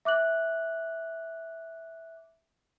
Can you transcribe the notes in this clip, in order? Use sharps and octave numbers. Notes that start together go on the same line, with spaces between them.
E5 D6 F#6 F#7